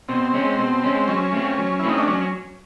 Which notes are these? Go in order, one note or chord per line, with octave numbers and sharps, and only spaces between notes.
B2 C4
G#3 C#4
B2
G#3 C#4
F#3 C#4
A3 C4
F#3
A3 C4 E4
D#4
D4
F#3 C#4